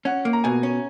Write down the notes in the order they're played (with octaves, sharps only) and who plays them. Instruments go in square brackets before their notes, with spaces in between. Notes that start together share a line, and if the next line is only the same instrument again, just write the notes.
[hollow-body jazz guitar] C#4 [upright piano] F#5
[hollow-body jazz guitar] A#3
[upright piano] A#5
[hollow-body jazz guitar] B2 [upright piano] G#5
[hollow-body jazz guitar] C#4